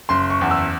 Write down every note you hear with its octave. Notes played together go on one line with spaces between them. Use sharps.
F#1 C6
C#6
E2
E6